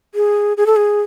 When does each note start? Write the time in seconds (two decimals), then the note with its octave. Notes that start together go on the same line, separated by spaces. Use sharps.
0.15 G#4
0.57 G#4
0.66 A4
0.76 G#4